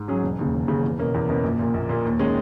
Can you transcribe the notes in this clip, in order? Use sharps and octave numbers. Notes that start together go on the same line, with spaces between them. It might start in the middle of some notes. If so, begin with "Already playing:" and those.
Already playing: G#2
F#3 C#4 G#4
E1
D#2 C#3
E1
D#2 C#3
E2
B2 A#3 C#4
E2
B2 A#3 C#4
A#1
A#2 A#3
A#1
A#2 A#3
D#2
D#3 G#3 C#4